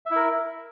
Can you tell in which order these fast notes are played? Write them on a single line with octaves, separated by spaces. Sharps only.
E5 E4 A#4